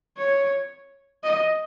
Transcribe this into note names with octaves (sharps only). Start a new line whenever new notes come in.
C#5
D#5